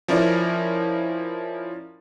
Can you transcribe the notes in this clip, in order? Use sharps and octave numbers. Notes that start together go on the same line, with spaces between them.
F3 C#4 E4 A#4 D5